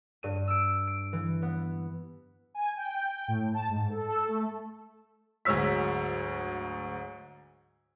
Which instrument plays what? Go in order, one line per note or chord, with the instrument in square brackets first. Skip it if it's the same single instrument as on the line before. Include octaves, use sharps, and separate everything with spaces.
[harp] G2 D#7
E6 D7
D7
E3
B3
[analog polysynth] G#5
G5
A2
A5
G#2
A4
A4
A3
[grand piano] D2 G#2 F#3 C#5 E6 B6